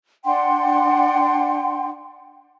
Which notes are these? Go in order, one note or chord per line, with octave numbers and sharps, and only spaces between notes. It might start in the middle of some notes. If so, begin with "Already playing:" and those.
D4 F#5 G5 C6